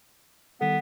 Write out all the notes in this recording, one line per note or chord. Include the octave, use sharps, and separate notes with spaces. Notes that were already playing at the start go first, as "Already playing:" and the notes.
D#3 G3 B3 A4